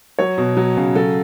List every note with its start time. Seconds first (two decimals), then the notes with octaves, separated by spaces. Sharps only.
0.19 F#3 C#5
0.38 B2
0.57 F#3
0.77 C#3
0.95 F#3 A4